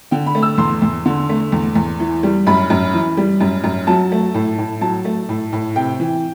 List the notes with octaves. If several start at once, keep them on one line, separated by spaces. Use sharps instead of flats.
D3 G5
B5
A3
E6
E2 C6
E2
D3
A3
E2
E2
E3
G3
F#2 B5
F#2
E3
G3
F#2
F#2
F#3 A5
A3
A2
A2
F#3 A5
A3
A2
A2
C3 G5
E3